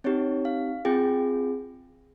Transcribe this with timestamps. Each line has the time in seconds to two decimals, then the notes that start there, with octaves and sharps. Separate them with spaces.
0.04 C4 D#4 G4 C#5
0.45 F5
0.85 C4 F4 G#4 G5